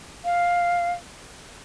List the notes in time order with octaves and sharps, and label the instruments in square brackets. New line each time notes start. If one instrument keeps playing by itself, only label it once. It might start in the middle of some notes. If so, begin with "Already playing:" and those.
[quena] F5